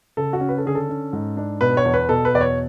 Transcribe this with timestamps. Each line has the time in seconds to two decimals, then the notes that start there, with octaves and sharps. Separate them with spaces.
0.17 C#3 A4
0.33 F#4
0.41 C#4
0.49 B4
0.58 A4
0.65 D3 G#4
0.75 A4
0.89 C#4
1.13 G#2
1.37 D4
1.61 B2 B4
1.77 C#5
1.85 E2
1.94 B4
2.09 B2 A4
2.25 B4
2.34 E2 D5
2.41 C#5